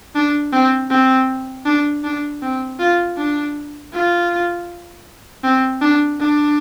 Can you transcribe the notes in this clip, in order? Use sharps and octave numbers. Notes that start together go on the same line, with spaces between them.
D4
C4
C4
D4
D4
C4
F4
D4
F4
C4
D4
D4